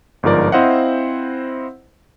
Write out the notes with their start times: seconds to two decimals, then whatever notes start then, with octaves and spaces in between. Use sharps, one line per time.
0.23 G1 G#2 F3 A#4 D5
0.52 C4 E4 C5 D#5 F5 F#5